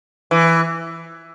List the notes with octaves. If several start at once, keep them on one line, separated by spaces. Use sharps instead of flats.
E3